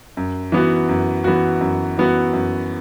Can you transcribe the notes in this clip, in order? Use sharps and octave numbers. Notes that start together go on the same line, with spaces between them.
F#2
E3 B3 F#4
F#2
E3 B3 F#4
F#2
E3 B3 F#4
F#2